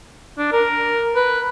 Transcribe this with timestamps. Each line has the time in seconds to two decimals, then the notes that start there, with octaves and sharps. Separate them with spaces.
0.38 D4
0.52 A#4
1.16 B4